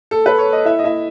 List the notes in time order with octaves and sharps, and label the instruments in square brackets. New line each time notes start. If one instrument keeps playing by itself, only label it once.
[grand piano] A4
B4
C#5
D#5
E4 E5
D#5
E4 E5